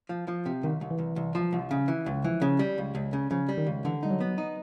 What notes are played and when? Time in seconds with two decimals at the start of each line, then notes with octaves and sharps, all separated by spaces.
0.09 F3
0.28 F3
0.46 C3
0.63 C2 D#3
0.81 C2
0.91 E3
0.98 C2
1.16 C2
1.35 F3
1.53 C2
1.71 C#3
1.88 E3
2.06 C#2
2.24 E3 F3
2.42 C#3
2.59 G3
2.78 C#2
2.95 C#2
3.13 C#3
3.31 C#3 F3
3.49 G3
3.58 D#3
3.67 C#2
3.84 D3 E3
4.03 G3 D#4
4.11 F#3
4.21 B3
4.38 D#4